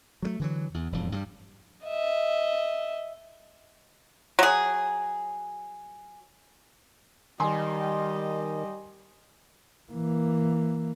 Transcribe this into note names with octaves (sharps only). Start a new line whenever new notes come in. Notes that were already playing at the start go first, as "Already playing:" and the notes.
F#3 G3 A3
D3 E3 F#3
E2
E1 F2 A2
G2 F#3 G3
D#5 E5
F#3 G#4
D#3 G3 D#5 G#5 C6
E3 A#3